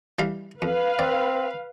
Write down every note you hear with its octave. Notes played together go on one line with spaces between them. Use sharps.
E3 G3 F5
F2 B4 F5
C4 D5